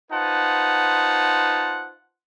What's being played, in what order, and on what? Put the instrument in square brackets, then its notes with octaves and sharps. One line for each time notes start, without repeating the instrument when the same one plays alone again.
[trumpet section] D#4 F4 B4 C5 F#5 A5